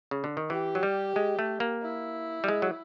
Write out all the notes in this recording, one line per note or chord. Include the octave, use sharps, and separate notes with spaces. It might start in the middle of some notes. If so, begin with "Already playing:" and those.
C#3
D3
D#3
E3 G4
F#3
G3
G#3
A3
A#3
E4
G3
G#3
F#3